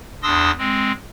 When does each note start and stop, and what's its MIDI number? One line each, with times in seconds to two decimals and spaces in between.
0.23 0.51 40
0.23 0.51 62
0.23 0.51 84
0.23 0.51 87
0.23 0.51 88
0.23 0.51 94
0.58 0.92 56
0.58 0.92 60